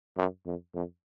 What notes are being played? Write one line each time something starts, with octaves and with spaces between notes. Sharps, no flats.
F#2
F2
F2